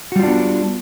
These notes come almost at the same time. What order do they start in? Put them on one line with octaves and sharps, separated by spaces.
F#4 G3 F4 D4 B3